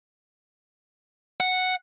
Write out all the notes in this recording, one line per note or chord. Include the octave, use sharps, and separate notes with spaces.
F#5